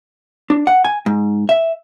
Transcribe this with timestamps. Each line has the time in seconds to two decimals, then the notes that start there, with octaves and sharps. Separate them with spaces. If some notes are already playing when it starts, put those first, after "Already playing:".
0.50 D4
0.67 F#5
0.85 G#5
1.06 G#2
1.49 E5